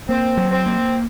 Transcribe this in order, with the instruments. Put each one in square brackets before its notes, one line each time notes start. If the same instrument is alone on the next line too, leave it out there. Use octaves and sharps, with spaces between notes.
[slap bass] A#3 [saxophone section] C4
[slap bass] F#3
[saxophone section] C4
[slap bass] A#3